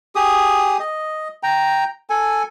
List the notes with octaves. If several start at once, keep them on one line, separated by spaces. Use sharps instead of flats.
G4 G#4 D#6
D#5
G5 A#5
A4 G#5